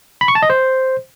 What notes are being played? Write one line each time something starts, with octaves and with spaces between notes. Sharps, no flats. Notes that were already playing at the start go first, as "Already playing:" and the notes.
B5
C#6
A5
D#5
C5